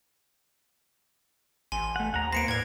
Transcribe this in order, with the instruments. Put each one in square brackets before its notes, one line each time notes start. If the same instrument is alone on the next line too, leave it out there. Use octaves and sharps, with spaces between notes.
[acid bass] A1 [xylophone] G#5 C6
[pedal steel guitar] A3 F#5
[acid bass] D#2 [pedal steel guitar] F#5 A#5
[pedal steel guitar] A#3 B3 C5 [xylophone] A#6 C#7 D7
[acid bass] A2 [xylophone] B4 G#6 [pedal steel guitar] D5 F5